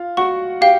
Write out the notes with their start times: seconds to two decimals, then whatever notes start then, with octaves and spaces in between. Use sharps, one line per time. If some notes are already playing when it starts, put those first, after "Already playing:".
Already playing: F4 F5
0.17 F#4 F#5 C#6
0.61 G4 F5 G5